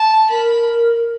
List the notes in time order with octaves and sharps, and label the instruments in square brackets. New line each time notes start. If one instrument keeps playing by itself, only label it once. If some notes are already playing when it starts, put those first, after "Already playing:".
Already playing: [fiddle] A5
[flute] A#4 [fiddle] B5